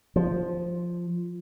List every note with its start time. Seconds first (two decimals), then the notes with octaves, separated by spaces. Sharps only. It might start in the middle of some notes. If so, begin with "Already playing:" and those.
0.16 F3